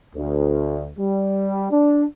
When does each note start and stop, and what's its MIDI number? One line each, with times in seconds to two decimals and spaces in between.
0.13 0.87 38
0.97 1.67 55
1.71 2.03 62